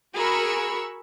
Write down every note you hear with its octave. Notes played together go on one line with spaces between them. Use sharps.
F#4 G#4 A#4 B5 C#6 E6